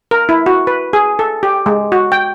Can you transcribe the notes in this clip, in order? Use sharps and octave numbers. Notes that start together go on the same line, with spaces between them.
A#4
E4
F#4
B4
G#4
A4
G4
G#3
F#4
G5